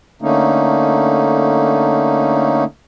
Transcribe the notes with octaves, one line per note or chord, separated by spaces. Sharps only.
D3 A3 A#3 C#4 D#4